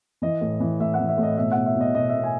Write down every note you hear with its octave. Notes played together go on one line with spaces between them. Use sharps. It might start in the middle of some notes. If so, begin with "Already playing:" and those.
E3 D#5
A2
E3
A2 E5
F#5
E3
E5
A2
D#5
B2 E5
B2 F#5
E5
B2
D#5
B2 D#5
E5
B2
G#5